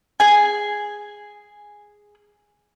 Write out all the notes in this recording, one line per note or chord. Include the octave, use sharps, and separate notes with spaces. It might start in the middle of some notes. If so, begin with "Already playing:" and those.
G#4 G#5